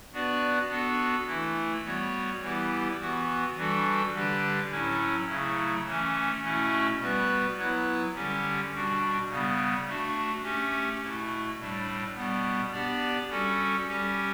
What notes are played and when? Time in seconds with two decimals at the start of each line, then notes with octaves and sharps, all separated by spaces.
0.13 B3 D4 F#4 B4 D5
0.69 B3 D4 F#4 A4
1.27 E3 A3 E4
1.84 G3 B3 F#4 C#5
2.41 E3 G3 B3 E4 G4
2.99 E3 B3 F#4
3.56 E3 G3 D4 F#4 A4
4.14 D3 G3 D4 G4 B4
4.70 A2 F#3 C#4 E4
5.27 C#3 F#3 A3 E4
5.85 E3 A3 C#4
6.42 B2 A3 C#4 E4
6.99 G3 B3 F#4 B4
7.56 F#3 B3 E4 B4
8.14 D3 G3 C#4 G4
8.72 B2 G3 D4 F#4
9.28 C#3 G3 B3
9.86 A3 D4 F#4
10.43 A3 C#4 G4
11.01 B2 A3 E4
11.58 A2 G3 D4
12.15 B2 G3 B3
12.72 B3 D4 G4 D5
13.29 G3 C#4 F#4 A4
13.87 G3 C#4 G4